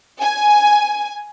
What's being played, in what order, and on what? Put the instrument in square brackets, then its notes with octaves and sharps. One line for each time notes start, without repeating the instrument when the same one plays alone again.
[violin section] G#5